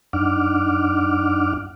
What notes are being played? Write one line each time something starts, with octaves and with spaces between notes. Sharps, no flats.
F#2 D4 D#4 F#5 D6 F6